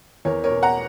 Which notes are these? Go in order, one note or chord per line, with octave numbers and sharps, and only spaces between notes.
E2 A#4 C#5
A#4 C#5
B2
F#5 A#5